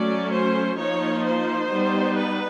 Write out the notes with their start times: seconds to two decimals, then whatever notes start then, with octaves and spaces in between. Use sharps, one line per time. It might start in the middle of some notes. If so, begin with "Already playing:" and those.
Already playing: F#3 A3 C#4 D5
0.32 C5
0.77 F3 A#3 D#4 C#5
1.23 C5
1.68 G3 B3 D#4
2.14 B4